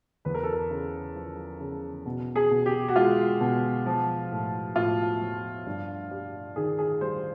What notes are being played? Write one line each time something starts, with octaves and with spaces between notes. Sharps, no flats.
E2 B4
A#4
A4
A#4
C#3
F3
C#3
B2
G#4
B2
G4
F#4
G#3 F4
B2
F3
A2
A2 F4
F3
G2
G3
D#3 G#4
G#4
G3 C5